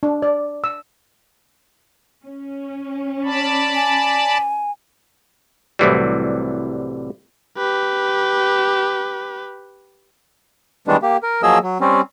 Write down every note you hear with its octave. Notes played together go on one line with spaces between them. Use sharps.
D4
D5
E6
C#4
D5 A5 B5
G#5
C2 A2 C3 E3 F#3 G3
G4 B4
D#3 E3 G3 G#3 B3 D4
A#3 G4
A#4
F3 F#3 A#3 G#4 D#5 E6
F#3
G3 C4 C#4